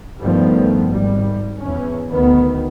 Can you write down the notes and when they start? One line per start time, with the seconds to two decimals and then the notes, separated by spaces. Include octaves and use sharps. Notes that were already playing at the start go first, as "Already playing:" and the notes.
0.21 G2 D#3 F3 G3 A3 B3
0.90 G#1 G3
1.62 E2 C#4
2.13 D2 D#3 B3